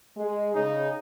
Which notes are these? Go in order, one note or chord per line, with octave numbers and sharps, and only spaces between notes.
G#3
C#3 D#4